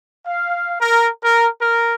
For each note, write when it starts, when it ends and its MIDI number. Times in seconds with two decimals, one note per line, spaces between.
0.24 0.73 77
0.79 1.06 70
1.22 1.46 70
1.58 1.94 70